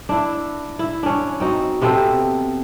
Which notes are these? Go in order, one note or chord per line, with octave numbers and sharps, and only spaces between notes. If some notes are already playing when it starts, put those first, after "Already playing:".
D4 E4
E4
C#4 D4
C4 D#4 F#4
C3 B3 C4 A4